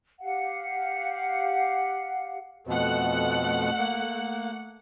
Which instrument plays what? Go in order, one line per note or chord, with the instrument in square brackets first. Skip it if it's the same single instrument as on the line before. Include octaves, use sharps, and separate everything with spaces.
[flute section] G4 F5 F#5
[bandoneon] F2 B2 [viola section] A3 F#5
[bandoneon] A#3